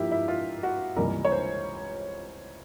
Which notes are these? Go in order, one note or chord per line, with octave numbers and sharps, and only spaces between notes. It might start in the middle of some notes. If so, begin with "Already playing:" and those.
Already playing: G#2 F3 A#3 E4 G4
E4
F4
F#4
C#2 C3 E3 G3 A#3 A#4
C#5
C5